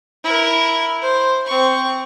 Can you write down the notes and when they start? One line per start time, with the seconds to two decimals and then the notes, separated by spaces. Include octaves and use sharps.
0.24 E4 A#4
1.01 C5
1.46 C4 C#6